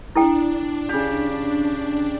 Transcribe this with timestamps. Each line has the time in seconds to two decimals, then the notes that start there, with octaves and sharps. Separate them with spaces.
0.16 D4 E4 A4 G5
0.89 C#3 G4